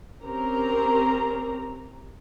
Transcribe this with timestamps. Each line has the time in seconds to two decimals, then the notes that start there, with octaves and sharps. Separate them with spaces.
0.23 C4 C#4 G4 A#4 A#5